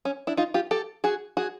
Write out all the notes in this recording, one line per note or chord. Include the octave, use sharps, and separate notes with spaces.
C#4
D4 E4
D#4 F4
F4 G4
G4 A4
F#4 G#4
F#4 G#4